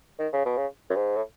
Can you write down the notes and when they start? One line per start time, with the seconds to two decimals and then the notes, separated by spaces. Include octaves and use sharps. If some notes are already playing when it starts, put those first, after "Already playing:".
0.19 D#3
0.33 C#3
0.46 B2
0.57 C#3
0.90 F#2
0.96 G#2
1.16 A2